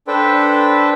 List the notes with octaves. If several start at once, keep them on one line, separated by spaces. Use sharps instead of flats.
D4 A4 B4 C5 G5